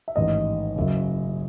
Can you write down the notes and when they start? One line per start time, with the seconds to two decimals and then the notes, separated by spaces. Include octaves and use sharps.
0.08 E5
0.16 A1 G#2 D#3 D#5
0.76 F#1 F#2 C#3